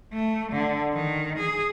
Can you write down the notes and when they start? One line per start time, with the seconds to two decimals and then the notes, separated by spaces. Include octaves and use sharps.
0.13 A3
0.52 D3
0.93 D#3
1.39 G#4